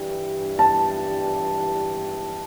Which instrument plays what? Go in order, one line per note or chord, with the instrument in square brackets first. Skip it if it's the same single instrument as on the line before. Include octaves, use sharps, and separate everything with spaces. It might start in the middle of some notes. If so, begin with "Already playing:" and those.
Already playing: [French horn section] G2 E3 G3 D4 G4
[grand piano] A5